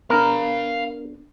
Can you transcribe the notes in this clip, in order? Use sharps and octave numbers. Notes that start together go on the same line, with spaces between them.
B3 D4 A#4 F5 B5